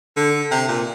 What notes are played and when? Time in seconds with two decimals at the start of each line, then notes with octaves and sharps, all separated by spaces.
0.17 D3
0.51 C3
0.68 A#2